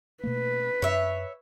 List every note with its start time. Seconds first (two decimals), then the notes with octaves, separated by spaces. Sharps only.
0.23 B2 A3 A#3 B4
0.82 F#2 C#5 E5